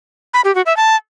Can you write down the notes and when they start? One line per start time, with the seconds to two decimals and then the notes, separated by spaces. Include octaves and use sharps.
0.34 B5
0.44 G4
0.55 F#4
0.66 E5
0.77 A5